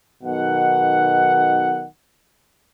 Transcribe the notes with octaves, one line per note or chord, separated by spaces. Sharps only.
B1 B2 D#3 F#5